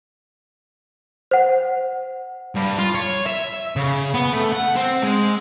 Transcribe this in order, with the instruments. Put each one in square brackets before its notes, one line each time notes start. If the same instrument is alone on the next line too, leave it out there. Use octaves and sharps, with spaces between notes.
[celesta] C5 F#5
[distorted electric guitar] G2
F4
C#5
E5
C#3
B3
A3
F#5
C4
G#3